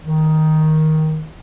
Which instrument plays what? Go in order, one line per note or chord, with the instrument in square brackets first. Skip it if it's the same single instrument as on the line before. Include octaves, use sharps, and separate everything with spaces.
[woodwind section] D#3